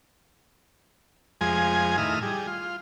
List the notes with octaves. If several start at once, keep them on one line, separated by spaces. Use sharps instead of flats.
F2 F3 G#3 G#4 G#5
A2 D#3 E4 D#6 F6
G3 G#4
F4